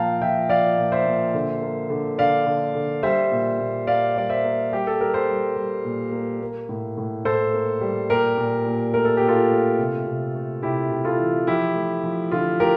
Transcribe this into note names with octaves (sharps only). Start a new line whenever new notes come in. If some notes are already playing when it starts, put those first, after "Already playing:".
Already playing: A#2 F3 F5 G5 A5 A#5
F3 E5 G5
F3 D5 F5
A#2
C5 E5
A#2
D3
A#3
D3
D3 D5 F5
D3
D3
G3 C5 E5
A#2
A#2
A#3 D5 F5
G3 D5
C5 E5
A#3
G3 G4
A4
G3 A#4
A4 C5
G3
G3
A#2
A#3
A#3
A2
A2
A2 A4 C5
A#3
G3
A#2 G4 A#4
A#2
A#2
A3 A#4
A4
A#2 G4
F4 A4
A3
C3
C3
A3
C3 E4 G4
C3
F4 A4
E3
F3 E4 G4
A3
F3
D3 F4
A3 G4 A#4